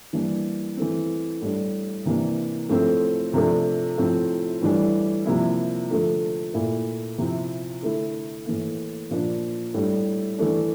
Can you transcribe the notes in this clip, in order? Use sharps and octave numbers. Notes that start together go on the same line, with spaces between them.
E3 G3 A#3 D4
E3 A3 C4
A2 G3 D4
C3 E3 A#3 D4
A2 F3 A3 C4
C3 F3 A3 D4
A2 F3 C4
A2 E3 G3 D4
C3 F3 A#3 E4
D3 F3 A3
A#2 A3 E4
C3 F3 C4 E4
D3 A3 E4
A2 E3 A#3
A#2 F3 A#3 D4
A2 G3 D4
E3 A3 D4